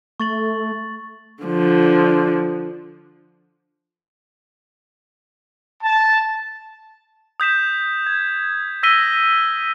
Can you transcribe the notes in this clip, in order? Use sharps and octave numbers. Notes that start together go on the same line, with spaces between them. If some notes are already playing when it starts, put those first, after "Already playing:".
A3 C#6 A6 F#7
D3 F3
A5
D#6 G6 B6 E7
G#6
E6 A#6 B6 D#7 G7